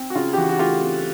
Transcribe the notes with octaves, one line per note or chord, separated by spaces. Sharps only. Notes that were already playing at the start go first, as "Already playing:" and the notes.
Already playing: C4
F#4
C#3 F4
G4
E3 F#4
F#4
A3 F4 G4
C4